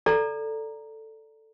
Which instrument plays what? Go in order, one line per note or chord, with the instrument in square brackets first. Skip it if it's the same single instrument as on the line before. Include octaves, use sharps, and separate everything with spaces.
[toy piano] A4 D5 A#5